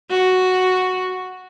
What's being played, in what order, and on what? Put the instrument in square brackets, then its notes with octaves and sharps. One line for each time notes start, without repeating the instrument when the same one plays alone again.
[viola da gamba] F#4